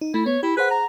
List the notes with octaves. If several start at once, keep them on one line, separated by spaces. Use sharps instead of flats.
D#4
A3 E4
B3 C#5
E4 G4
G#4 B4 C5 F#5
A#5